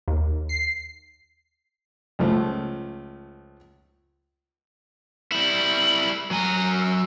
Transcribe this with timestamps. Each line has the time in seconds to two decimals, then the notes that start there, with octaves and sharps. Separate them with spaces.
0.08 D#2
0.49 C7
2.19 C#2 F3 A3
5.32 G3 E4 F#7
6.31 F#3 G#5 A#5
6.81 E6